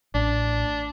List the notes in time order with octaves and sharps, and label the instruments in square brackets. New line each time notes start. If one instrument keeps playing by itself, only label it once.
[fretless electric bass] A1 [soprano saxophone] D4